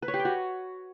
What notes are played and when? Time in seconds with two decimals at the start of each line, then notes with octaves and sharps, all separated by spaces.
0.02 B4
0.08 C#5
0.14 G4
0.19 G5
0.25 F#4